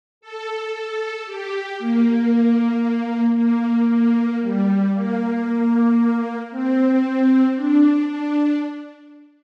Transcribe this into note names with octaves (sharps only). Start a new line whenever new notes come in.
A4
A4
G4
A#3
A#3
A#3
G3
A#3
C4
D4
D4